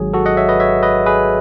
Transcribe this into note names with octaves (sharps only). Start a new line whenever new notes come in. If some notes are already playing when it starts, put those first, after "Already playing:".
Already playing: G#1 G#2 F#3 G#4
F#4 A4
D#5 F#5
C#5 E5
B4 D#5
C#5 E5
B4 D#5
G#4 B4